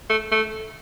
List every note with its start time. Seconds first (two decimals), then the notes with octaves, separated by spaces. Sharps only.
0.10 A3
0.32 A3